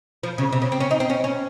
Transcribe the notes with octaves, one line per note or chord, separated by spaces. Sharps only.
F3
C#3
C3
C#3
C4
C#4
D#4
C4
C#4
C#4